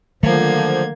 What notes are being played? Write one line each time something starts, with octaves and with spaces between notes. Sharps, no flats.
D3 D#3 F3 F#3 A3 A#3 G#6